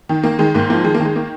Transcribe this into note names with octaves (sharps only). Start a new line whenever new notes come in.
D#3
D#3 A#3
D#3 G#3
G#2 A#3
F3 A#3
D#3 G#3
A#3
D#3 G#3
A#3